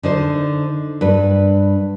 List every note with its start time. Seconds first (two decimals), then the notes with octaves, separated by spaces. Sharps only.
0.03 D3 D#4 C5
1.01 G2 B4